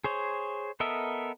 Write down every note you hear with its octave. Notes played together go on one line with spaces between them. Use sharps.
G#4 C5 C#5
B3 A4 A#4 D#5 E5